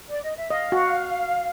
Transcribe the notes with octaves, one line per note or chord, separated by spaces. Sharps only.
D5
D#5
E5
D#5 F5
F#4